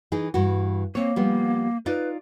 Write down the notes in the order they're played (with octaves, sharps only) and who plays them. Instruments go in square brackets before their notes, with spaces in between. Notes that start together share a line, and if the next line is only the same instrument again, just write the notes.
[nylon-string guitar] E3 D#4 G#4
G2 E3 F#4
[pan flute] A#3 [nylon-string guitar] C4 C#5
[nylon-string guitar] F3 G3 B3
[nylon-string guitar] D#4 F4 D5 [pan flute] B4